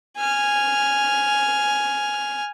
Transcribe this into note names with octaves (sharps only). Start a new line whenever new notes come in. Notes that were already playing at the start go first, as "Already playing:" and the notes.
G#5 F6